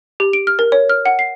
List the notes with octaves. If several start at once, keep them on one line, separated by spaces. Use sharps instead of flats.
G4
D7
F6
A#4
C#5
F6
F#5
C7